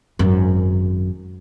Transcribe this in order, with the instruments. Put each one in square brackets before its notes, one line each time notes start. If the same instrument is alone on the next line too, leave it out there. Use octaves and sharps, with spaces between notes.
[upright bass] G#1 F#2